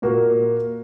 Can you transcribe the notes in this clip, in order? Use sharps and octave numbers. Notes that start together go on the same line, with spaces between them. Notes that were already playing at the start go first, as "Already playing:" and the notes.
A#2 A#3 F#4 A#4